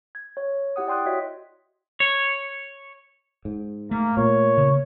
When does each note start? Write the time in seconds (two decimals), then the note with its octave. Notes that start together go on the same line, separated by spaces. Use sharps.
0.15 G#6
0.37 C#5
0.76 E4 G4 F#5 D#6
0.87 D5 G5 C6 D#6 F#6
1.06 F#4 C#5 D#5 E5 B6
2.00 C#5
3.45 G#2
3.91 A3 A#3
4.17 A#2 A#3 C#5
4.58 C#3